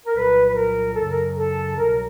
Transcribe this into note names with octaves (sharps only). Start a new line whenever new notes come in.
A#4
C2 A#2 F#3 B4
B4
A#4
F#2 C#3 F#3 A4
A#4
A4
C2 B2 F#3 A#4